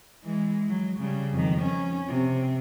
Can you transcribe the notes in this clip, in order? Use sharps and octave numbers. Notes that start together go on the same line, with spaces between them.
E3 G#3
F#3
C#3 G3
F2 D#3
C#4
C3